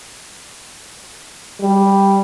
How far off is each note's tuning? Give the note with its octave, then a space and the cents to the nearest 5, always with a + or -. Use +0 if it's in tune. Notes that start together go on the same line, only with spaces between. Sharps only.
G3 +5